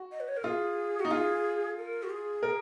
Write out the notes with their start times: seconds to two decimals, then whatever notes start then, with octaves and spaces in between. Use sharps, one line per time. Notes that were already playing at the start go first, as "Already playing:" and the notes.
Already playing: F#4
0.12 D#5
0.20 B4
0.28 C#5
0.37 A#4
0.44 F4 G#4
1.00 F#4
1.05 D#4
1.11 F4 G#4
1.77 A#4
2.03 F#4
2.10 G#4
2.43 A#4